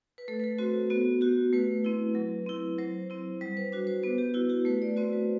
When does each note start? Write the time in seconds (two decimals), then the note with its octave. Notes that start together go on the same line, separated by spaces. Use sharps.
0.18 B4
0.28 A3 A4
0.40 B4
0.44 A4
0.58 C4 F#4 C5
0.90 B3 F#4
1.21 F#4 G4
1.53 A3 B4
1.84 C4 E4
2.15 F#3
2.46 C4 E4
2.78 F#3 C5
3.10 C4 E4
3.41 G3 C5
3.57 B4
3.72 D4 F#4 C5
3.87 C5
4.03 B3 B4
4.18 G4
4.34 E4 F#4
4.50 G4
4.65 A3 B4
4.82 D5
4.96 C4 F#4 C5
5.13 B4